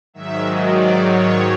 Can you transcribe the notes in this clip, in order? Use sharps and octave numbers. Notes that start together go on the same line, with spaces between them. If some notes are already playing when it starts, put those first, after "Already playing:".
G#2 D#3 F#3 E5
D5
C#5